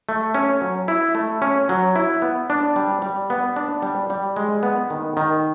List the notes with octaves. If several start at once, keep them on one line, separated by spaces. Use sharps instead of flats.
A3
C#4
F#3
E4
A3
C#4
F#3
E4
B3
D4
G3
G3
B3
D4
G3
G3
G#3
B3
D#3
D#3